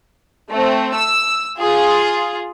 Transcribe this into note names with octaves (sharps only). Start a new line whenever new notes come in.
A3 C4
E6
F4 G#4